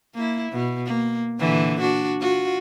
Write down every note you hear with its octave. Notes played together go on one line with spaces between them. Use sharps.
A#3 E4
B2
A#3
A#2 D3 E3
D4 F#4
F4 F#4